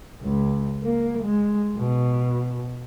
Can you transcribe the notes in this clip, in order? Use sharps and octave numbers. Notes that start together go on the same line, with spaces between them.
C#2
A#3
G#3
B2